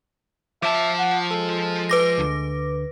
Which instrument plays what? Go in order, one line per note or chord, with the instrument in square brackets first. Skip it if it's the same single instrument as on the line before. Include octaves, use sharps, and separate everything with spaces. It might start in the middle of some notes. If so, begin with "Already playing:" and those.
[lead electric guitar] F3 A5 [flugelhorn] E5 [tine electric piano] D6
[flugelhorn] F#5
[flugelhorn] G#3 [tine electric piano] A4
[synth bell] B4 D6 A#6
[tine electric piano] D2 D3